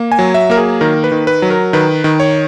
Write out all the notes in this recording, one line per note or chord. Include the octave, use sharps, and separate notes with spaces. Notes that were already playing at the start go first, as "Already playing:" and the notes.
Already playing: A#3
G#5
F#3
E5
A#3 A#4
G#4
D#3 A#4
B4
D#3
B4
F#3
A#4
D#3 B4
D#3
C#5